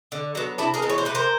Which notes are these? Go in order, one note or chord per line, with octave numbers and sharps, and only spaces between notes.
D3
F#3 B3
C3 D4 E4
G#4 A#4
E3 G#3 B3
C#5
C5
C3 B4
A#4 C5